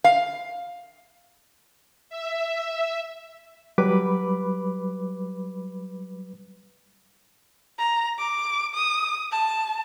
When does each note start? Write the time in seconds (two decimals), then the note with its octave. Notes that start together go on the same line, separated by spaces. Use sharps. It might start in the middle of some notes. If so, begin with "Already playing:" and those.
0.04 F5
2.10 E5
3.78 F#3 G3 B4 B5 D6
7.79 A#5
8.18 D6
8.74 D#6
9.32 A5